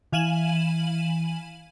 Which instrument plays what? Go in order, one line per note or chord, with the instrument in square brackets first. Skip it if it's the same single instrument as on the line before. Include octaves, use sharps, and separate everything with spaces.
[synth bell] E3 F5 G#5 D#7 E7 F#7